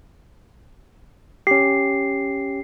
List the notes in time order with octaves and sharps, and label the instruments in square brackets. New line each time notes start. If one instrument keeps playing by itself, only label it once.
[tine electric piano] C#4 G4 [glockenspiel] C7